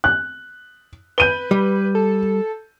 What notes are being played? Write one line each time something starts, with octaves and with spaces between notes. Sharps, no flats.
F#6
B4 G6 D#7 G7
G3
A4